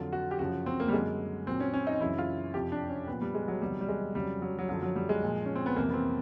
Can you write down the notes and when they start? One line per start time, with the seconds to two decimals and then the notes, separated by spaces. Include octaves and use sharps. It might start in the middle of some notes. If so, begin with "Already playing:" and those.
Already playing: F2 D3 F#3 F4
0.13 F#4
0.31 G4
0.39 F#2 C#3 F3 F#4
0.66 C4
0.80 A#3
0.88 G3
0.93 F#2 D3 F#3 G#3
1.47 A#2 F#3 C4
1.60 C#4
1.74 C#4
1.87 D#4
2.00 F#2 C#3 E3 E4
2.18 F4
2.54 F2 C3 F3 G4
2.72 D4
2.90 C#4
3.07 A#2 F3 B3
3.22 G3
3.35 G#3
3.48 F#3
3.61 E2 C3 D#3 F#3 G3
3.81 G3
3.88 G#3
4.15 F2 C#3 F#3 G3
4.42 F#3
4.59 F#3
4.69 F#2 D3 F3 F#3
4.83 F#3
4.96 G3
5.09 G#3
5.23 A#2 F3
5.45 C#4
5.55 C4
5.66 B3
5.76 F2 C3 E3 A#3
5.90 B3
5.94 C4